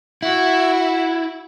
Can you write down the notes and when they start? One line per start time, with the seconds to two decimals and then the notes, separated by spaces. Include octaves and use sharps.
0.23 E4 F#4